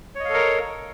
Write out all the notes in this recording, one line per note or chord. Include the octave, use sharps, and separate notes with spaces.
A4 A#4 C#5 D#5 F5